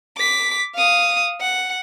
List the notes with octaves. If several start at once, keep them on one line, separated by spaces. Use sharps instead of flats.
D6 B6
F5 D#6
F#5